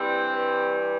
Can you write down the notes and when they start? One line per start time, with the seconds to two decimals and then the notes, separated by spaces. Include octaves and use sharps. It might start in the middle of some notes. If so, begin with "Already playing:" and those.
Already playing: G2 E3 G3 C4
0.29 G2 E3 G3